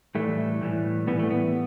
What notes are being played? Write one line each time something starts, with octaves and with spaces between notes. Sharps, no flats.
A2 E3 G3 A3
A2 E3 G3
A2 E3 G3 B3
A3
B3